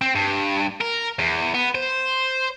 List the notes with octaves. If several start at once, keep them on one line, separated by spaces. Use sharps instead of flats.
C4
G2
A#4
E2
B3
C5